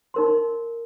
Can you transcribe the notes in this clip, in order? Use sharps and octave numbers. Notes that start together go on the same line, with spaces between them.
D#4 A#4 C6